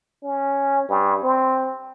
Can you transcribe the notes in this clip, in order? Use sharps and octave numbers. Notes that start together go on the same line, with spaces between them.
C#4
G2
C4